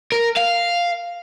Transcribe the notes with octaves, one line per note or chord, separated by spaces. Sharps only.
A#4
F5